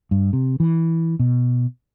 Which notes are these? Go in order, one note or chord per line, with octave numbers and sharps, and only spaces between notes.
G2
C3
E3
B2